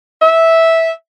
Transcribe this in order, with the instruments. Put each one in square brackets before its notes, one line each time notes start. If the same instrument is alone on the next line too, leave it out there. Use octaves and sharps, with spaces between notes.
[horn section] E5